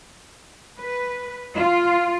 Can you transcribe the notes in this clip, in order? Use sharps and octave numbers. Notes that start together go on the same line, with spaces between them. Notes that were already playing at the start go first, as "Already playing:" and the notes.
B4
F4